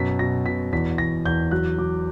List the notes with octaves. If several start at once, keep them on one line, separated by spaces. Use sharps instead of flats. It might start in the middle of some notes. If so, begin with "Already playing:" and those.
Already playing: F#2 B2 B6
B2 A#6
B2 B6
E2 B6
E2 A#6
E2 G6
F#3 F#6
F#3 D6